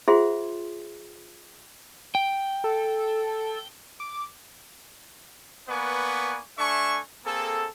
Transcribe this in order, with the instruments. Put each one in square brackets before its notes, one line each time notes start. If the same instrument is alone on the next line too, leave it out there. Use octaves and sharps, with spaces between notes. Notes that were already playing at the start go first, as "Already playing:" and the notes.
[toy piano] F4 G#4 C5 E5 F#5 C6
[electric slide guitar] G5
[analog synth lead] A4
D6
[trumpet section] A#3 B3 B4 D5 G#5 C#6
A3 D4 E5 G#5 C#6
A#3 C4 G#4 A4